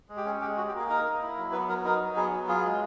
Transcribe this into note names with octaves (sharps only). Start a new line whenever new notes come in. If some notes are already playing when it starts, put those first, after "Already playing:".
G#3
G4
C#4 G#4
G#3 G4
F#4
G4
A#3
G#4
D#4 A#4
A#3
E4
F#3
B3 B4
F#3 A#4
D#4 A#4
F#3
B3 G#4
F#3
F4 G#4
G#3